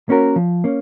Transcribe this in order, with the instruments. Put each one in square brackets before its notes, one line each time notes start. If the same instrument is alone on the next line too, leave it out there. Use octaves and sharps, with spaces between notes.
[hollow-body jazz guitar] A#3 C#4 F#4 A#4
F3
A#3 C#4